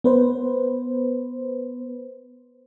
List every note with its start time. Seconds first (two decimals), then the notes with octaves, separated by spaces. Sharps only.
0.04 B3 B4 C5